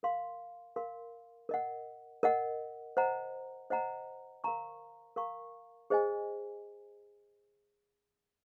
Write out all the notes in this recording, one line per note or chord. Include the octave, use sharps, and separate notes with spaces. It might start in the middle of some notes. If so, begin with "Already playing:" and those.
A#4 F5 C6
A#4 F5 C6
A#4 D#5 F#5
A#4 D#5 F#5
C5 D#5 F#5 A#5
C5 D#5 F#5 A#5
A#4 F5 A#5 C#6
A#4 F5 A#5 C#6
G#4 C5 D#5 G#5